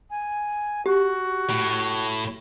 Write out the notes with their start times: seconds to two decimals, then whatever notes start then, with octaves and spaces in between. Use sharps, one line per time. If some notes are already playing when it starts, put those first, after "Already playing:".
0.10 G#5
0.86 F#4 G4
1.50 A2